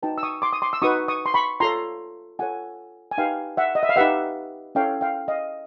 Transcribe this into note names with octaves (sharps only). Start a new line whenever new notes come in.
D#4 F#4 B4 G5 A5
E6
C#6 D#6
C6 D6
D#6
C6 D6
E6
D#4 F#4 B4 C#6 D#6
C#6 D#6
C6
B5 C#6
F4 A4 C#5 A#5 C6
F4 A4 C#5 F#5 G#5
G#5
D#4 G4 B4 F5 G5
E5 F#5
D#5
E5
F5
D#4 G4 B4 E5 F#5
C#4 E4 A4 C#5 F5 G5
F5 G5
D#5 F5